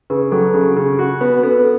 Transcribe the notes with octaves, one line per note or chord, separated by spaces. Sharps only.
C#3 B4
F#3 A4
C#3
C#3
F#4
B3
B3 A4
B4
A4